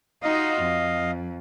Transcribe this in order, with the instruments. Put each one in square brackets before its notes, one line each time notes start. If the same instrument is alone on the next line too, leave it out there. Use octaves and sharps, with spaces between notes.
[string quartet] D#4 F4 F#4 [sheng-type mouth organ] D#5 F5
[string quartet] F2